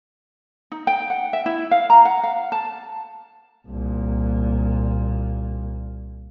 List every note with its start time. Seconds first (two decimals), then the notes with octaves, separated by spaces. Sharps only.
0.72 D#4
0.87 G5
1.10 F#5
1.33 E5
1.46 E4
1.71 F5
1.90 A#5
2.05 F#5
2.23 F5
2.52 A5
3.68 C2 A#2